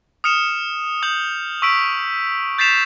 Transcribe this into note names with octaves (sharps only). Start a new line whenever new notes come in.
D#6 F6 C#7 E7 F7
D#6 G6 F7 F#7
C#6 E6 B6 D7
G6 A6 B6 C7 E7 F7